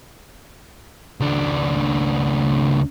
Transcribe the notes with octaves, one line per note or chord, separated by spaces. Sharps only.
C#2 D4